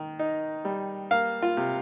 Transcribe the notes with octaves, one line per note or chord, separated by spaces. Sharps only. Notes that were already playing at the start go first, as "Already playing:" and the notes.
Already playing: D#3
D#4
G3
A#3 F5
F4
C3